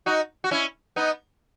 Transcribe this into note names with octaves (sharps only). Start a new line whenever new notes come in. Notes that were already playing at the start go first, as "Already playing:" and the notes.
D#4 F#4
F#4
C#4 E4
B3 D#4